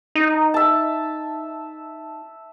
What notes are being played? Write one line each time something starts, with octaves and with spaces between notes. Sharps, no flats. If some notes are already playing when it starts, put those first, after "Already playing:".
D#4
E5 A5